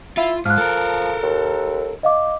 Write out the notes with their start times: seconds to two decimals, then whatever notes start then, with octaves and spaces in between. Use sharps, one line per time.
0.17 E4 F4
0.46 G#2 F3 F6 F#6
0.58 A4 A#4
1.23 D#2
2.03 D#5 F5 D6